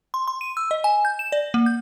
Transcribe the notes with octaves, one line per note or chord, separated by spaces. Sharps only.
C6
C6
D#7
E6
D#5
G#5
G6
E7
D5
A#3
G6